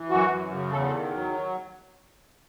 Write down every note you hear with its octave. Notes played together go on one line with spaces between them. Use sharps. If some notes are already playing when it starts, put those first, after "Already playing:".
Already playing: E3
F#2 F#4
F#2
C#3
E2 A4
A4
D#3
F#3